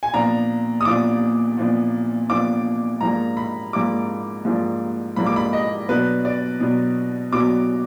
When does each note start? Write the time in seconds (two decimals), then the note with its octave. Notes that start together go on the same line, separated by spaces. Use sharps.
0.03 G#5
0.14 A#2 F3 B3 D4 A#5
0.81 D#6
0.85 A#2 F3 B3 D4 D6
1.58 A#2 F3 B3 D4
2.29 A#2 F3 B3 D4 D6
3.01 G#2 F3 A#3 D4 A#5
3.37 B5
3.73 G#2 F3 A#3 D4 D6
4.45 G#2 F3 A#3 D4
5.16 G#2 F3 A#3 D4 B5
5.26 D6
5.36 B5
5.53 D#5
5.89 B2 F#3 B3 D4 B4
6.25 D5
6.60 B2 F#3 B3 D4
7.32 B2 F#3 B3 D4 D6